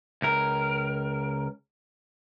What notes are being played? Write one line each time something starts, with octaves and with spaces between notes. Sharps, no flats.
C#2 A#4